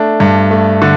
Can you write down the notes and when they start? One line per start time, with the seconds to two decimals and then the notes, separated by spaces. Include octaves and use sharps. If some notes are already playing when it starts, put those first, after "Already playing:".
Already playing: A3 D4
0.20 G2
0.51 A3
0.82 D3